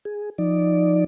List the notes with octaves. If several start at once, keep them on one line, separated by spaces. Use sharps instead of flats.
G#4
F3 D#4 D5